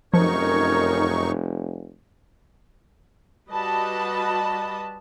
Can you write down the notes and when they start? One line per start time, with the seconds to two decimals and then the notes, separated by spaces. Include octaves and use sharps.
0.14 F1 F#2 F3 D#4 A#4 C#5 C#6
3.50 G3 F#4 B4 D#5 A5 B5